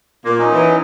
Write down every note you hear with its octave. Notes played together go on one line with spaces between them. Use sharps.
A#2 A#3
F#3 C#4 D#4
E3